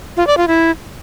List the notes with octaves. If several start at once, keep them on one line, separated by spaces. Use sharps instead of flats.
F4
D5
F4
E4